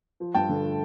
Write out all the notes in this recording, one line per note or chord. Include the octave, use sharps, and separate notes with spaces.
F3
G2 G5 A5
D3
A3